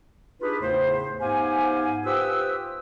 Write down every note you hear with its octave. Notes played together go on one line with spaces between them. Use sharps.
D4 D#4 F4 G4 G#4 B4
E2 A2 C#3 A3 C5
G#2 B3 G4 C5 F5 G#5
F4 G4 B4 C5 D#6 E6